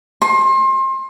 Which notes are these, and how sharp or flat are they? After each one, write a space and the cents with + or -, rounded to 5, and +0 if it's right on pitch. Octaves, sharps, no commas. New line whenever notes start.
C6 +30